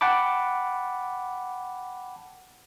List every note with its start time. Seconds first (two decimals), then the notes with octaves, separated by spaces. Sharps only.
0.01 F#5 G5 A5 B5 D6